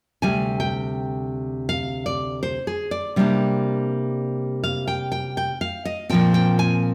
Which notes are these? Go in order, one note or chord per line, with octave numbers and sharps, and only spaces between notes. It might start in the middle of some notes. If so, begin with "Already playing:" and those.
D2 C3 G3 G#5
G5
F5
D5
C5
G#4
D5
C3 G3 A#3 D4
F5
G5
G5
G5
F5
D#5
A#2 F3 C4 G5
G5
G#5